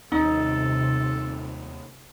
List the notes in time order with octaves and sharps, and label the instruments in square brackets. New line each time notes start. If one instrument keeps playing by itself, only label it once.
[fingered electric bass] D#2 C#4 [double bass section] C3 [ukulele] D#4 [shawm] A4